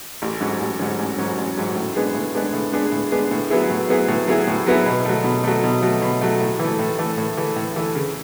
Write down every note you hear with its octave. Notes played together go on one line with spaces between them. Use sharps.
A1
G#2 F#3 C#4
A1
G#2 F#3 C#4
A1
G#2 F#3 C#4
A1
G#2 F#3 C#4
A2
G#3 B3 D4 G#4
A2
G#3 B3 D4 G#4
A2
G#3 B3 D4 G#4
A2
G#3 B3 D4 G#4
A2
F#3 B3 E4 G#4
A2
F#3 B3 E4 G#4
A2
F#3 B3 E4 G#4
A2
F#3 B3 E4 G#4
B2
F#3 A3
B2
F#3 A3
B2
F#3 A3
B2
F#3 A3
A2
E3 A3
A2
E3 A3
A2
E3 A3
A2
E3 A3
C#3